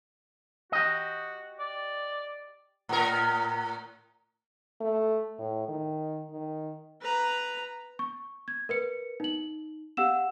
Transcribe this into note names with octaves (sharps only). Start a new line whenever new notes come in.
F#4 G4 D#5
D5
A2 A#4
A3
A2
D#3
D#3
B4 A#5
C#6
G#6
A#4 B4 C#7
D#4 F#7
G4 F5 F#5 E6 E7